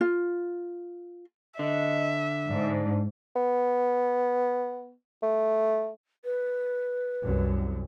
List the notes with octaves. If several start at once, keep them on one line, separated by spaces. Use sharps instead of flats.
F4
D3 D#5 E5
G#2 D4
B3
A3
B4
C2 F#2